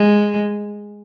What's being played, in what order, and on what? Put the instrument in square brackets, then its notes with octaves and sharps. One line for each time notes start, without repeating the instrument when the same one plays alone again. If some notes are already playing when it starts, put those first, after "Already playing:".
Already playing: [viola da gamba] G#3